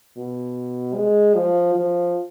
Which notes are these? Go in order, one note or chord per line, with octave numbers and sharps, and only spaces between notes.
B2
G#3
F3
F3